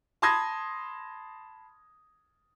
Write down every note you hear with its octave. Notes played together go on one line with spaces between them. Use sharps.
A5 B5 C6 D#6 G#6 A#6